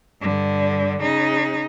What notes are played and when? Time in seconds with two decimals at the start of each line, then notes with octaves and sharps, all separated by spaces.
0.21 G2 D3
1.01 C#3 D#4